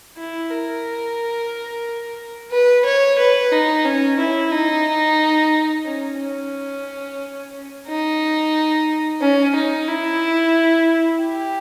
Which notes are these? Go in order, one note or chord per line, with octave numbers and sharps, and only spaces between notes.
E4
A#4
B4
C#5
B4
D#4
C#4
E4
D#4
C#4
C#4
D#4
C#4
D#4
E4
G4